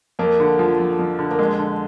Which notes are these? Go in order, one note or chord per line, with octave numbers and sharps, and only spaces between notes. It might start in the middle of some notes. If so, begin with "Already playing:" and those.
F2 A#3
D3
F3
F2
F2
D3
A#3
F2 G#3
D3